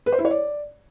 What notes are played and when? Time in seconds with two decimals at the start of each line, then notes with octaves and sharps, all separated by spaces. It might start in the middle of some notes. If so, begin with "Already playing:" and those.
0.06 B4
0.12 C5
0.19 E4
0.25 C#5
0.31 D5